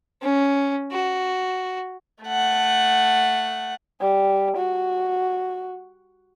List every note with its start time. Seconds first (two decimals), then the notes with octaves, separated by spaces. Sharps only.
0.22 C#4
0.92 F#4
2.23 A3 F#5
4.01 G3
4.56 F#4